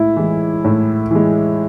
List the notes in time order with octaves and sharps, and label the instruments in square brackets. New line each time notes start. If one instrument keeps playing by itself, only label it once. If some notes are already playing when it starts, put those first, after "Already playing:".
Already playing: [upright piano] A2 G#3 [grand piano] E4
[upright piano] E3 G#3
A2
E3 G#3